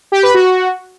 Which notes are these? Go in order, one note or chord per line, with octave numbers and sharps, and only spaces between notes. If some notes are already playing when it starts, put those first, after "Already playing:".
G4
B4
F#4